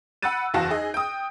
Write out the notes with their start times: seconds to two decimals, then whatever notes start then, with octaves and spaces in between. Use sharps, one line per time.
0.22 F#5 B5 E6 F#6 A6 D#7
0.54 F#1 E2 F#4 F5 A5 A#6
0.70 D#4 G#4 D#5
0.94 G5 D#6